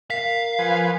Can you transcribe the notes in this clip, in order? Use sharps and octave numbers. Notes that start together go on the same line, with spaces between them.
A#4 F5 B6
F3 B4 G#5